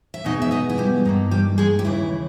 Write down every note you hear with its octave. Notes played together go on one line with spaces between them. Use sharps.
E5
E2 B2 G#3 B3 D#4 D#5
E5
D#4 D#5
E4
G3 G4
G2 D#3 A#3 D#4
G3 G4
G#3 G#4
G4
D#2 C#3 E3 E4